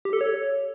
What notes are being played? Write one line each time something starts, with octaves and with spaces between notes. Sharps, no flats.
G4
A4
C#5